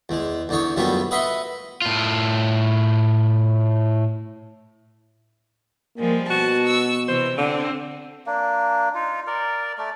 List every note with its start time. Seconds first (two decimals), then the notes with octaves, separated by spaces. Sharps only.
0.09 E2 G#3
0.49 E2 D3 D#4 C#5
0.76 F#2 D3 G3 A3 B3 F4
1.11 B4 D#5 E5 F#5 B5 C6
1.82 A2 F4
5.98 F3 G3 G#3 A#3
6.30 B2 F#4 A5
6.65 C#6 E6
7.08 C3 E3 C5
7.38 D3 C4
8.26 A#3 D4
8.95 D#4 F4
9.27 A#4 D5
9.78 A3 D5